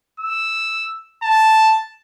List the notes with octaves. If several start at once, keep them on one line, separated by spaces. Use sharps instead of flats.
E6
A5